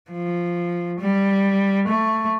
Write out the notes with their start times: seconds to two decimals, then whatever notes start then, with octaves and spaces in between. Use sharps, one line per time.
0.12 F3
1.00 G3
1.88 A3